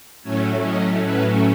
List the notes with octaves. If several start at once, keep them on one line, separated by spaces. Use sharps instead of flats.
A2 F#3 A3 C#4 C#5
D#5
B4